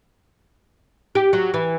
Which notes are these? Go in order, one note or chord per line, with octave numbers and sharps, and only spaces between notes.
G4
F#3
E3